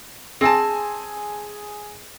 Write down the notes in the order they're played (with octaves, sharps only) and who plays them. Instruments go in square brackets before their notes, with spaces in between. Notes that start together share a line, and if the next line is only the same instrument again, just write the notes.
[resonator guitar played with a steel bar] C4 A5 [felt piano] G#4 G#5